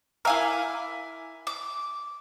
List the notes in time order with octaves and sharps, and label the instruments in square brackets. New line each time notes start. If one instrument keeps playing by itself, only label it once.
[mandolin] E4 G#5 D6 [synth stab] A#4 E5 F5
[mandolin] D6